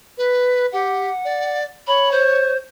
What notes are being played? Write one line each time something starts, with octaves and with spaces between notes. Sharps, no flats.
B4
G4 F#5
D5
C#5 B5
C5